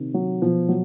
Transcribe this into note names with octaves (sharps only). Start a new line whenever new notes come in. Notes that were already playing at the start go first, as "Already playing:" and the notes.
Already playing: C3 D#3
F#3
B2 F3
F#3